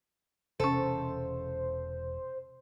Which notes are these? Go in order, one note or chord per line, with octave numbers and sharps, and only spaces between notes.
E1 C3 C#4 A4 C5